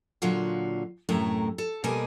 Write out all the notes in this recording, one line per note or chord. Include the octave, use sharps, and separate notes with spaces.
A#2 D3 F#3 F4 F#4
F#2 A2 C3 A3 E4 A#5
A4
B2 G3 A#3 D#5 G#5